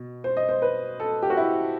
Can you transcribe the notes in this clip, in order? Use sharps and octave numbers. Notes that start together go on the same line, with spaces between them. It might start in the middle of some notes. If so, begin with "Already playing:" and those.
Already playing: B2
C5
D#5
C5
B4
A4
G4
F#4
E4